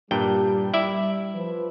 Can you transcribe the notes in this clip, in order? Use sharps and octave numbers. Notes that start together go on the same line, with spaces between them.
G2 A#2 G3 G5
E4 D5 E5
F3 B4